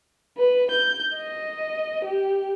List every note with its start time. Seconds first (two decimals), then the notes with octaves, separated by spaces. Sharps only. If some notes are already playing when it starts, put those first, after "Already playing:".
0.37 B4
0.71 G6
1.16 D#5
2.05 G4